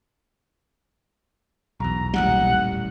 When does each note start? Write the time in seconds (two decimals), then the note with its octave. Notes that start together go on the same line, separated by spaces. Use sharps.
1.80 B1 E2 A#5
2.14 D#1 A1 G3 F#5